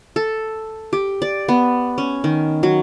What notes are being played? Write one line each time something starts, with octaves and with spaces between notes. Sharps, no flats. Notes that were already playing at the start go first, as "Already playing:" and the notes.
A4
G4
D5
B3
C#4
D#3
F#3